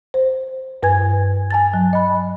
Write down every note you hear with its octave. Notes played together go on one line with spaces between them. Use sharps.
C5
G2 B4 G#5 G#6
G#5 A5 A6
F#3
D#5 B5